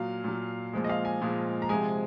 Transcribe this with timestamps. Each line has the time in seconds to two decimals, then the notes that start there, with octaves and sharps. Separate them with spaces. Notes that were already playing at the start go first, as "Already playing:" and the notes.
Already playing: A#2 F#3 F5
0.24 A#2 F#3
0.73 A#2 F3 G#3
0.84 D#5
0.89 F5
1.05 G#5
1.22 A#2 F3 G#3
1.62 A#5
1.69 C3 F3 G#3 G#5